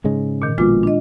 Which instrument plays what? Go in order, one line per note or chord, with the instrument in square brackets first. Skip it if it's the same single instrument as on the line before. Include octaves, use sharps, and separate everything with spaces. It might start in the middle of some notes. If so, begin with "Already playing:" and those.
[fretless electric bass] G#2 C#3 G#3
[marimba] A#2 D#3
[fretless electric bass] A#1 B2 [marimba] G#3 F4 D6
[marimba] D4 D#5